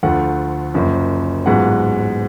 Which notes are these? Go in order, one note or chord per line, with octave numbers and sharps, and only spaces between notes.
D2 D3 F3 A3 F#5
F#1 F#2 F3
A1 G#2 F#3 B3 F4 F#5